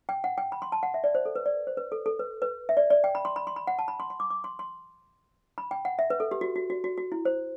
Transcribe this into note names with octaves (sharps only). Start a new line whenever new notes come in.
G5
F#5
G5
B5
C6
A5
F#5
E5
D5
C5
A4
B4
D5
C5
B4
A4
A4
B4
B4
E5
D5
D5
G5
B5
C6
B5
C6
B5
F#5
A5
B5
C6
C6
D6
D6
C6
C6
B5
G5
F#5
E5
B4
A4
G4
F#4
F#4
F#4
F#4
F#4
E4
C5